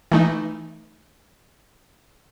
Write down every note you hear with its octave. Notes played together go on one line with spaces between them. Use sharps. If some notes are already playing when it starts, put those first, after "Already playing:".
E3 A3 D#4